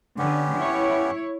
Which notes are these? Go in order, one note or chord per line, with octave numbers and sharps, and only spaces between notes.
D3 B3 C#4 G4
E4 C#5